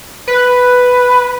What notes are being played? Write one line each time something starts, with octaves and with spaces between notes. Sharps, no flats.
B4